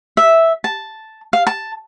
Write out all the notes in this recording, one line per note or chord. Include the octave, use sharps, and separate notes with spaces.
E5
A5
F5
A5